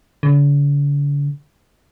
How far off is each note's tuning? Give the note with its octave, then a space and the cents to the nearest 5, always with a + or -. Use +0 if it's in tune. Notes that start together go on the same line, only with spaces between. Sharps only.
D3 -45